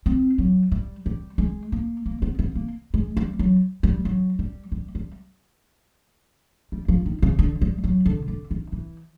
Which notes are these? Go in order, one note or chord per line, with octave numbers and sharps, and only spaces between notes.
C4
F#3
G3
G3
G#3
A#3
A#3
B3
B3
A#3
G#3
G3
F#3
G3
F#3
G3
G3
G3
G3
F3
D#3
C#3
D3
G3
F#3
D3
D3
D#3
E3